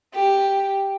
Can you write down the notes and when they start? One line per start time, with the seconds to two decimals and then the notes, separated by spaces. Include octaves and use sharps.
0.14 G4